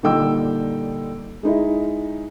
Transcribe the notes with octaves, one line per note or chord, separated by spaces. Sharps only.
A#2 D3 G3 D#4 G5 E6
G#3 D#4 E4